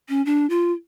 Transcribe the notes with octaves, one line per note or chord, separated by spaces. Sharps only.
C#4
D4
F4